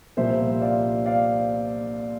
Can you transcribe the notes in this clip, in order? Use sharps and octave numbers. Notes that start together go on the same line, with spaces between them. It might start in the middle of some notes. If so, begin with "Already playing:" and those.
C2 A#2 F3 A#3 C5 E5
D5 F5
D5 F5